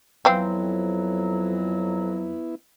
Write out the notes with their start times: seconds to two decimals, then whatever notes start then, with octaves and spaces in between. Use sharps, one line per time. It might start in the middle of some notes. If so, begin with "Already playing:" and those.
0.25 F2 E3 F#3 B3 C4 E4 F5